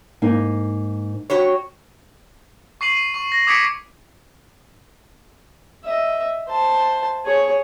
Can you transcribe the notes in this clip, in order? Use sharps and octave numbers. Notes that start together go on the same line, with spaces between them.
G#2 A#3 D#4
F#4 G4 C#5
C#6 C7 D#7 F#7
D#7
C#6
A#6
D6 D#6 G#6 B6 C#7 D7
D#5 E5
C5 A5
G#4 C#5